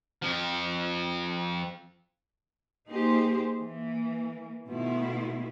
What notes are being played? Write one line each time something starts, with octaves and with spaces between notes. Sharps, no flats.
F2 F3
A#3 D#4 G4 G#4 C5
E3 A#3
B2 D#3 A3 B3 E4 F4